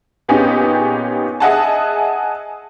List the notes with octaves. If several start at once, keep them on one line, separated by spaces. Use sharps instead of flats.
A#2 B3 C#4 D#4 G4 G#4
G#4 D#5 E5 F#5 G#5 A5